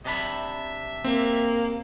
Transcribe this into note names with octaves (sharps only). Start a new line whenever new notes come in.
C3 D4 E5 B5
A#3 C4